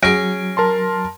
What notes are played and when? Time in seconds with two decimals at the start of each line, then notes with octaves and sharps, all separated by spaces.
0.03 F#3 C#4 G#4 A#6 D7
0.57 A#4 A5 C6